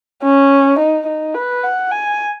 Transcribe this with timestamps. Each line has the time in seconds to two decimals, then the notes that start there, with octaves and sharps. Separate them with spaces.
0.23 C#4
0.79 D#4
1.07 D#4
1.34 B4
1.64 F#5
1.91 G#5